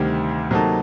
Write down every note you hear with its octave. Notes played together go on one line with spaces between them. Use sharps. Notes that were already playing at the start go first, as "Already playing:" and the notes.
Already playing: D2 C3 D#3 G3
C3 F#3 A#3 D#4 A4